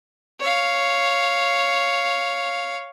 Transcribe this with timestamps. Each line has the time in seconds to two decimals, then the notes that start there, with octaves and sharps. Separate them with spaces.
0.40 C#5 F5